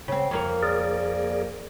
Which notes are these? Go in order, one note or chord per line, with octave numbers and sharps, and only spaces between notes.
C#3 C4
F2 A#3 C#5
G#4 A#4 D5